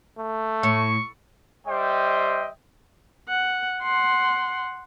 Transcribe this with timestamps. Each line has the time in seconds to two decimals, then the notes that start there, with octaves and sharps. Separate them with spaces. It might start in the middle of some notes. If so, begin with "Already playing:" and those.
0.19 A3
0.63 A2 C#6
1.67 G3 C5 D#5 E5 G5
3.29 F#5
3.82 F#5 C6